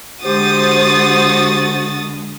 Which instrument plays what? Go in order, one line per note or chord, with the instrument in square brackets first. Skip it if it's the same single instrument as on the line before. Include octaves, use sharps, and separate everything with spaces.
[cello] D3 G#3 [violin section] F#4 D#6 A6 [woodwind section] G4 C5